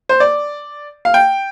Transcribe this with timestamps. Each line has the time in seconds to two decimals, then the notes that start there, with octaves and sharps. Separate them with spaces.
0.09 C5
0.20 D5
1.05 F5
1.14 G5